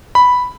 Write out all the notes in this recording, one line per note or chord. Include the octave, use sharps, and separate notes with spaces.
B5